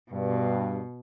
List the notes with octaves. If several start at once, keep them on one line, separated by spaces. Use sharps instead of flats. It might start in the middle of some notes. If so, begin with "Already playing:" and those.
G2 B2